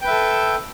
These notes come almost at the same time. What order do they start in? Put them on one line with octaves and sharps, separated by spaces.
G5 B4 E5 A4